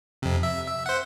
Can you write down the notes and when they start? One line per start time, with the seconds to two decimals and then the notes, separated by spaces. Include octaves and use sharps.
0.22 F2 C3
0.43 E5
0.67 E5
0.86 C5 F#5